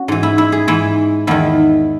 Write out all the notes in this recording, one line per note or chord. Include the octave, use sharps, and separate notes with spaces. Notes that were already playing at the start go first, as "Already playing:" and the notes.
Already playing: C#4 F#4
G#2 E3
E4
E4
G#4
G#2 E3 E4
E2 D#3 E4